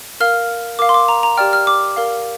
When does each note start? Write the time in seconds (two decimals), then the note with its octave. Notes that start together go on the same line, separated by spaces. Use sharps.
0.20 A#4 F5 F6
0.79 A#4 F5 D6
0.89 C6
0.94 D6
1.08 A#5
1.23 A#5
1.37 G4 D5 G5 F6
1.53 F6
1.67 D6
1.96 A#4 F5